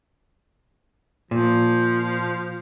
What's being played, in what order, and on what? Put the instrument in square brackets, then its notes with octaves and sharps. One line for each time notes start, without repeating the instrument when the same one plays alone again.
[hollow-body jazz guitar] A#2 [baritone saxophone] F3